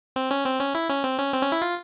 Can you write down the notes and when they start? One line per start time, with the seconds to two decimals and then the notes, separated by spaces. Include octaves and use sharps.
0.16 C4
0.31 C#4
0.46 C4
0.60 C#4
0.75 E4
0.89 C#4
1.04 C4
1.19 C#4
1.33 C4
1.42 C#4
1.52 E4
1.62 F4